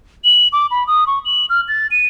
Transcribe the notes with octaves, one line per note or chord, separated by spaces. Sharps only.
F#7
D6
B5
D#6
C#6
F#7
F6
A6
D#7